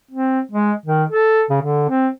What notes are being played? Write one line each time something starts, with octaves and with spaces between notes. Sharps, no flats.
C4
G#3
D#3
A4
C#3
D3
C4